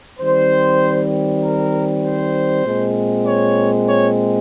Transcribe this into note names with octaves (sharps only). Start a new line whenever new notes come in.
D#3 G3 C4 C5
A#4
C5
A#2 G#3 C4
C#5
C#5